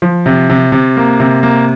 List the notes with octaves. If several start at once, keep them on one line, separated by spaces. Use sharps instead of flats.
F3
C3
C3
C3
A#3
C3
A#3